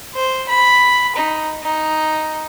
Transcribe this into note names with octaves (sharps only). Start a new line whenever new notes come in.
C5
B5
D#4
D#4